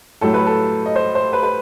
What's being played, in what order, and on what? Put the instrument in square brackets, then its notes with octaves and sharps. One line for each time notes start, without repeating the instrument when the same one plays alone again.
[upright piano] A2 F#3 A3 A4
B4
A4
D#5
C5
C5
B4
B4